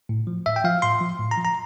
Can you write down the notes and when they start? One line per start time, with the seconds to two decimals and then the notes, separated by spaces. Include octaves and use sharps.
0.09 A2
0.27 F3
0.46 A2 E5
0.56 G5
0.64 F3 F5
0.82 A2 C6
1.01 F3
1.19 A2
1.31 A#5
1.38 F3
1.45 A#5